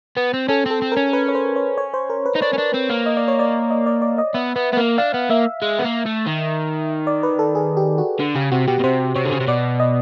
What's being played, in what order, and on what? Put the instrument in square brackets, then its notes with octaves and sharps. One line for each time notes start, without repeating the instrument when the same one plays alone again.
[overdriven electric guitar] B3
C4
[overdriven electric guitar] C#4 [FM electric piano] A4
[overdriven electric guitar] C4 [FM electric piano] A4
[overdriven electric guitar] C4
[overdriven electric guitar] C#4 [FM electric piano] A#4
[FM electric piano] B4
C#5
C5
C#5
C#5
C5
A#4
B4
[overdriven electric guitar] D#4
[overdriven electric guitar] D4 [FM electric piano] C#5
[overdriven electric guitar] C#4
D4
C4
A#3
[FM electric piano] D#5
D5
C#5
D5
D#5
D5
D5
D#5
[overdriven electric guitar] B3 [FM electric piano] E5
[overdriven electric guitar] B3
B3
A#3
[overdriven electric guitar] D4 [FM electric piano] F5
[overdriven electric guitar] B3
[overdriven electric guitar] A#3 [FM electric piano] E5
[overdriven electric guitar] G#3
B3
A#3
A3
D#3
[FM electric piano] D5
B4
A4
G#4
G4
F#4
[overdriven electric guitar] D3
[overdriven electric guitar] C#3 [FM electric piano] G4
[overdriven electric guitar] C3 [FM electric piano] F#4
[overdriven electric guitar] B2 [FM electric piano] G4
[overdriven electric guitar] B2
[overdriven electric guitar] C3 [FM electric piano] C5
[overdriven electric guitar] C3 [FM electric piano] C#5
[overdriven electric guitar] D3
C#3
C3
[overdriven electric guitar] B2 [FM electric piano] D5
[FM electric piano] D#5